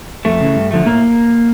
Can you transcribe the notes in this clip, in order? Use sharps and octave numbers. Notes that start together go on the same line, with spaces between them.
F2 A3
C#3 E3
G2
D3 F3 A3
A2 A#3